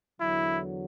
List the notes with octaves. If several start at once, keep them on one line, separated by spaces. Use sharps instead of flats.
E2 D3 F#3 E4